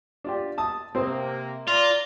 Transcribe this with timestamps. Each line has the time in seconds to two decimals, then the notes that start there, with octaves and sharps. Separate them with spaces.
0.24 D4 F4 G4
0.58 A5 D#6
0.95 C3 A#3 C4 C5 D#6
1.68 F4 D5 A#5